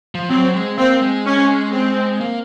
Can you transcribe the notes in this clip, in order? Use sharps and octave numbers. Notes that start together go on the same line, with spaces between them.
F3
F#3 C4
G#3
A#3 C4
G#3
C#4
C4
A#3